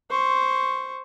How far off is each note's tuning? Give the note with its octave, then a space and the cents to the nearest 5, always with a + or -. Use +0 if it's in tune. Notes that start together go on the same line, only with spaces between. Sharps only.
C5 +0 C#6 +0